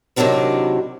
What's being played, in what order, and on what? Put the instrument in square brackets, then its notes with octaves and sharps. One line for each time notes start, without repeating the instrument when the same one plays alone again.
[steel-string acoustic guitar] C3 D#3 F3 F#3 D4 E4